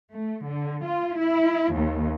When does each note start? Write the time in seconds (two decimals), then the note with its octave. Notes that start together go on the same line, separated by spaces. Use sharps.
0.11 A3
0.45 D3
0.85 F4
1.18 E4
1.74 D#2